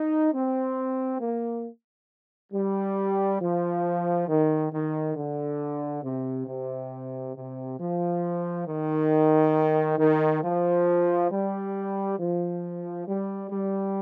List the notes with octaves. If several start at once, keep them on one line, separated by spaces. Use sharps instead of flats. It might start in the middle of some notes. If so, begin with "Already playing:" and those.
Already playing: D#4
C4
A#3
G3
F3
D#3
D#3
D3
C3
C3
C3
F3
D#3
D#3
F3
G3
F3
G3
G3